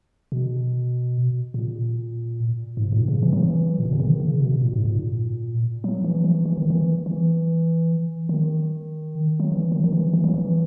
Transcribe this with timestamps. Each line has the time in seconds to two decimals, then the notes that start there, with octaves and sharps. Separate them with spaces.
0.32 B2
1.54 A#2
2.77 G#2
2.92 A#2
3.08 C#3
3.23 E3
3.33 F#3
3.43 E3
3.79 A#2
3.85 B2
3.93 C#3
4.00 D#3
4.20 C#3
4.40 B2
4.61 A#2
4.73 G#2
4.85 A#2
5.84 F#3
6.04 E3
6.24 E3
6.45 E3
6.57 D#3
6.70 E3
7.06 E3
8.29 D#3
9.40 F#3
9.52 E3
9.72 D#3
9.84 D#3
9.92 E3
10.13 E3
10.24 F#3
10.34 E3